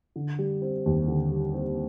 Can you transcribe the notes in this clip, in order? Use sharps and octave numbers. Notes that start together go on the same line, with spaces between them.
D3
G3
C4
D#2
D3
G3
C4